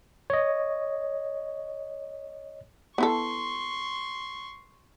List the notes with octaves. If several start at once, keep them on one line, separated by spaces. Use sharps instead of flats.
C#5 D#5
B3 E4 A4 C6 C#6